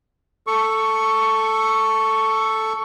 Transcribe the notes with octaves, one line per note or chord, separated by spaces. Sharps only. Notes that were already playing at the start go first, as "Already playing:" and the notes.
A4 C#6